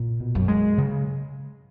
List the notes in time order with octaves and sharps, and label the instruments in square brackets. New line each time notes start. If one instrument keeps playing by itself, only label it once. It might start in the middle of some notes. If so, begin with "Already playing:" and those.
Already playing: [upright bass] A#2
[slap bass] B2
[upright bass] F#2
[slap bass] G#3
C#3